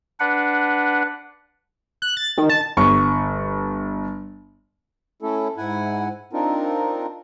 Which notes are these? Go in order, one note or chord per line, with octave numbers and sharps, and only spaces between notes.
D4 B4 F#5
F#6
A6
D#3
A5
G1 C#6
A3 C#4 E4 A4
G#2 E4 F#5 G#5
C4 D4 D#4 F4 A#4